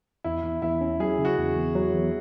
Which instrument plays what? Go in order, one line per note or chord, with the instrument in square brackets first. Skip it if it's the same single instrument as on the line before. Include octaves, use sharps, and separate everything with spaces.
[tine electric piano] E2 [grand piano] E4
[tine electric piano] E2
[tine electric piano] E2 [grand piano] E4
[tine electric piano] C#4
[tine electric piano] F#3 [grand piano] G#4
[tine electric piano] C#3
[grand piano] F#4
[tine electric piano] E2
E2
F#3
E2